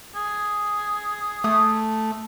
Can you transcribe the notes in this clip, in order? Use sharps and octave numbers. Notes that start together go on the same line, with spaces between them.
G#4
A3 D#6